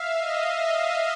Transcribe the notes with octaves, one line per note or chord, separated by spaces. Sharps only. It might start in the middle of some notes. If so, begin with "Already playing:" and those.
Already playing: E5 F5
D#5